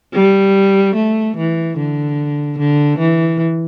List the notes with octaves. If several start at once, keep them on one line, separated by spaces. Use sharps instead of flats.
G3
A3
E3
D3
D3
E3